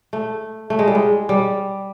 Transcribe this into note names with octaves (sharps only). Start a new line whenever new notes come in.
A3
A3
G#3
G3
G#3
G3